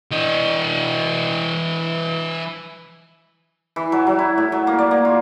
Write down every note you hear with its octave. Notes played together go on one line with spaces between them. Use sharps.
E3 D#5
E3
F#3
F#3
E4
A2
F#3
A#3
D5
A#3
F4